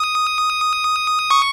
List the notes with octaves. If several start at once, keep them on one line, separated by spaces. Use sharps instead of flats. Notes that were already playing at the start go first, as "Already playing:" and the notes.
Already playing: D#6
C#6